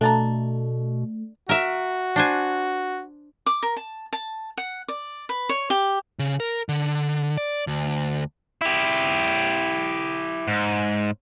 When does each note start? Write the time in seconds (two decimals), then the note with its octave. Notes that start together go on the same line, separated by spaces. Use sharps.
0.01 B2 A3 D4 A5 A#5
1.49 F#4 A#4 E5
2.16 D4 C5 G#5
3.46 D6
3.63 A#4
3.77 A5
4.13 A5
4.57 F#5
4.88 D5
5.29 B4
5.49 C#5
5.70 G4
6.19 C#3
6.40 A#4
6.69 D3
7.38 D5
7.67 D2
8.61 E4 G4
10.48 G#2